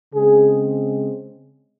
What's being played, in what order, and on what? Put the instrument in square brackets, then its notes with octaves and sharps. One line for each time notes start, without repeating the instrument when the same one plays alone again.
[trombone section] C#3 G#3 C4 G#4